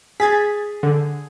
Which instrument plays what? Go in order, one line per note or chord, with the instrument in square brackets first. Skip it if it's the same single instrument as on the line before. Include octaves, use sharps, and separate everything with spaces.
[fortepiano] G#4 [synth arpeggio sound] G#6 A6 B6
[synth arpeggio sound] D3